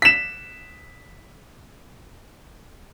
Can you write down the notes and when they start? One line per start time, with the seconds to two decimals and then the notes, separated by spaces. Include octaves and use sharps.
0.02 B6 E7